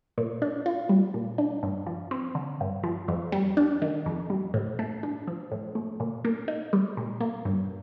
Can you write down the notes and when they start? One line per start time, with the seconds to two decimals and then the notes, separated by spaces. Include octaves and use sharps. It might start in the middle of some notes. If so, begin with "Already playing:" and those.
0.18 A#2
0.42 D4
0.66 F4
0.89 G3
1.14 A#2
1.38 D4
1.63 G2
1.86 F3
2.11 C4
2.35 D3
2.60 G2
2.84 F3
3.08 F2
3.32 G3
3.57 D4
3.82 D#3
4.06 F2
4.30 G3
4.54 A2
4.79 A3
5.03 D4
5.27 F3
5.52 A2
5.75 A3
6.00 A#2
6.25 A#3
6.48 D#4
6.73 G3
6.97 A#2
7.20 A#3
7.45 G2